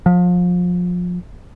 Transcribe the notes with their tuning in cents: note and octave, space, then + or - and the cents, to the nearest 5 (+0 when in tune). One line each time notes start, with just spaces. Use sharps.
F3 +30